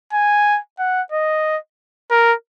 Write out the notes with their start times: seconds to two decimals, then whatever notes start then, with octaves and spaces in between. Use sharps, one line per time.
0.13 G#5
0.79 F#5
1.12 D#5
2.11 A#4